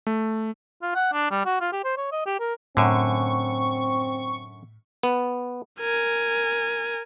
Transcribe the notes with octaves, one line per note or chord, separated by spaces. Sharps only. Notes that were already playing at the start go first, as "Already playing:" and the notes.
A3
F4
F#5
D4
G3
F#4
F4
G4
C5
C#5
D#5
G4
A#4
F#2 A2 D3 C4 C#6
B3
A#4 G#5